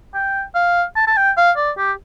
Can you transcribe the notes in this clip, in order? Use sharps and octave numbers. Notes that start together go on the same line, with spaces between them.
G5
F5
A5
A5
G5
F5
D5
G4